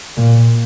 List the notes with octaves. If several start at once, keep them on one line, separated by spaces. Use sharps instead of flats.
A#2